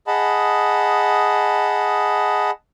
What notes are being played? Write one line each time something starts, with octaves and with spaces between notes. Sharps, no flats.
G#4 D#5 F#5 A5 B5